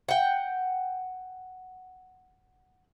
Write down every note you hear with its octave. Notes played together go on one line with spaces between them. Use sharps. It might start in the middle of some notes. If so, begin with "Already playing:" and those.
F#5 G5